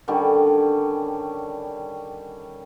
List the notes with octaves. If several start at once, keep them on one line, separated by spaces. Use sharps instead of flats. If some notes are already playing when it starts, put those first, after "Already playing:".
D3 D#3 G3 C#4